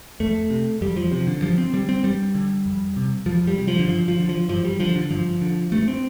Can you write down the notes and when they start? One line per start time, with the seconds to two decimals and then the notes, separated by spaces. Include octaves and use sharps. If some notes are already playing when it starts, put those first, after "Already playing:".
0.20 F2 A3
0.50 C3
0.81 F2 G3
0.97 F3
1.12 C3 F3
1.27 D3
1.42 G2 F3
1.58 C4
1.73 D3 G3
1.89 C4
2.04 G2 G3
2.35 D3
2.66 F2
2.96 C3
3.26 F2 F3
3.47 G3
3.57 C3
3.68 F3
3.79 D3
3.88 G2 F3
4.08 F3
4.19 D3
4.29 F3
4.49 G2 F3
4.65 G3
4.80 D3 F3
4.96 D3
5.10 G2 F3
5.41 D3
5.72 G2 A3
5.88 C4